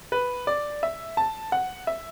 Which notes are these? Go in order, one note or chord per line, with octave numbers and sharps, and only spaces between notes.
B4
D5
E5
A5
F#5
E5